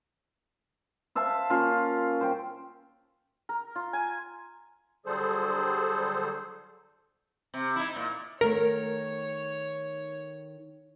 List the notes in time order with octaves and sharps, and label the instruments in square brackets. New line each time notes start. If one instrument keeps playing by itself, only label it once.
[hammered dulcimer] C5 E5 F5 A5
A#3 C#4 F4
C5 G5
[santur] A#4
F4
G#5
[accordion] D3 F#3 G3 G#4 A4 C5
[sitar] C3
D#4 E4
A#2
[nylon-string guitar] D#3 A3 B3 [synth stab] A#4 [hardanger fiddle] C#5